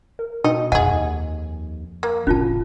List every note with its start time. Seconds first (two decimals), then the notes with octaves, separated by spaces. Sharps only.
0.19 A#4
0.44 B2 D#4 D#5 G5
0.72 F2 G#4 D#5 F#5 G#5
0.88 D#2
2.03 A#3
2.27 F#1 A2 E3 C#4 F4 A5